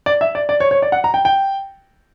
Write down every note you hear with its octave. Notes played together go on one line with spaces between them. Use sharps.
D5
E5
D5
D5
C#5
C#5
D5
F#5
A#5
G5
G5